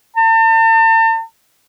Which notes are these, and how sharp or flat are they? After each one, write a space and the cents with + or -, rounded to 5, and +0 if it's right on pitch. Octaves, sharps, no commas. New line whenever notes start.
A5 +40